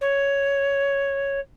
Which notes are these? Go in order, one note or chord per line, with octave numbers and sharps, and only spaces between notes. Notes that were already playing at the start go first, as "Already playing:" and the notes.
C#5